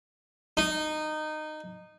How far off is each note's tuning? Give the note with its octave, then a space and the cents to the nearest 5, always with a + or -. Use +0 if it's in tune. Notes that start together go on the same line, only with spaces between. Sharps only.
D#4 -15